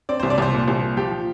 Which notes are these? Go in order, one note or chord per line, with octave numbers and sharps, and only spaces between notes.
C4 D5
C5
C2
D5
C2 C5
A#2
C2
A#2
F3 G4
F3